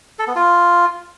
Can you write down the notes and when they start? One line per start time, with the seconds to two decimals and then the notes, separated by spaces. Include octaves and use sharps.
0.19 A4
0.27 B3
0.36 F4